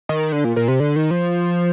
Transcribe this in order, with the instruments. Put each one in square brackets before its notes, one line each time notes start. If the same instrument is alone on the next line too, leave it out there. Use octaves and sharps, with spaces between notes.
[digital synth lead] D#3
D3
A#2
A#2
C3
D3
D#3
F3